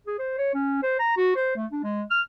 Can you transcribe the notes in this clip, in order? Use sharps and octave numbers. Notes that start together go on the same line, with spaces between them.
G#4
C5
C#5
C#4
C5
A#5
F#4
C5
A3
D4
G#3
F6